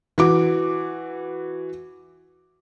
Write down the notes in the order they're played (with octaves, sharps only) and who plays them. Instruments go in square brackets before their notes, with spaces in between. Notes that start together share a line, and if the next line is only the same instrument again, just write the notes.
[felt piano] E3 F#4 D6